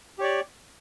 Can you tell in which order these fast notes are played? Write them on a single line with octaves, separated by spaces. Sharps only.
G4 C#5 D5